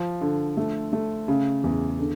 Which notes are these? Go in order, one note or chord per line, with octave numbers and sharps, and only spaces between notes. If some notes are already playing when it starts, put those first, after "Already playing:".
Already playing: F3
D3
A3
A3
C#3
E2
D3